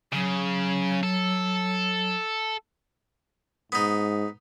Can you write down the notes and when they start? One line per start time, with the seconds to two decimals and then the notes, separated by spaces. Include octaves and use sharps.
0.13 C#3 F#3
1.03 A4
3.72 G#2 B3 D#4